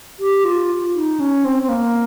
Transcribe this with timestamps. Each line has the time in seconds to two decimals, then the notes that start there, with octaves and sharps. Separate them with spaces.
0.19 G4
0.45 F4
0.94 D#4
1.20 C#4
1.45 C4
1.63 C4
1.69 A#3